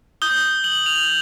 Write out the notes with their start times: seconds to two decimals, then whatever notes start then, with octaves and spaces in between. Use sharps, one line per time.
0.22 D#6 G6 G7
0.64 F#7
0.86 F7